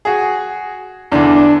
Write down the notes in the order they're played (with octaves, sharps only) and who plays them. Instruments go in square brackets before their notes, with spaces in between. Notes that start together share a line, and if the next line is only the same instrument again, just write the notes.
[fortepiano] F#4 G#4
[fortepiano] E2 D3 [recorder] D4